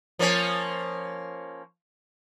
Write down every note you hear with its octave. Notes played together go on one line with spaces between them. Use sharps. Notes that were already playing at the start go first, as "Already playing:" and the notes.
F3 A#3 C#4